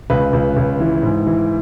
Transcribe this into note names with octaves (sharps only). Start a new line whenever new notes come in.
C#2 B4
C#2
C#2
E3
G#2
E3